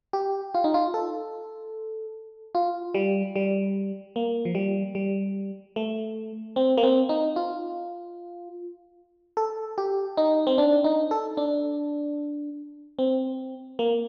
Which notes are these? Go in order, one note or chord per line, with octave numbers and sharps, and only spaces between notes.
G4
F4
D#4
F4
A4
F4
G3
G3
A#3
F3
G3
G3
A3
C4
A#3
C4
D#4
F4
A4
G4
D#4
C4
D4
D#4
A4
D4
C4
A#3